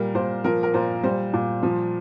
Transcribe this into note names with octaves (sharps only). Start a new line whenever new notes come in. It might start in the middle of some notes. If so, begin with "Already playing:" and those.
Already playing: A#2 G3 A#4
A#2 C5
F3 A#4
A#4
A#2 C5
G3 C5
A#2
F3